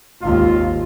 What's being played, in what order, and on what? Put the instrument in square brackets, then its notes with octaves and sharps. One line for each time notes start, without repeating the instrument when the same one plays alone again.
[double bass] G#1 D#2 [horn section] F4